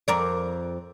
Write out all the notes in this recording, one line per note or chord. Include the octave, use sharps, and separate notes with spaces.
F2 A#4 D5